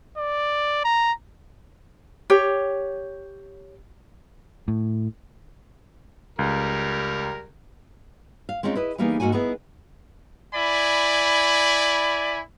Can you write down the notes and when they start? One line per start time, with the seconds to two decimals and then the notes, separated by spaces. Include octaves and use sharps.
0.18 D5
0.85 A#5
2.30 G4 C#5
4.68 A2
6.39 C#2 G3 A#4
8.49 F5
8.63 G#3 C4 C#4 D#4 F4
8.75 E4 B4 D#5
8.98 E3 G3 A#3 B3 D#4 G#4
9.20 G#2 A#3 F#4 F#5 G#5
9.32 B3 D#4 E4 G#4
10.55 E4 D5 G#5 B5